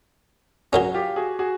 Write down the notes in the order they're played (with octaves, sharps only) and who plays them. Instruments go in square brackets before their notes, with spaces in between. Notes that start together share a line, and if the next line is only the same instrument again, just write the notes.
[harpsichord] F#3 A#3 C#4 [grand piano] F#4 G#4
[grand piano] F4 G4
F#4 G#4
F#4 G#4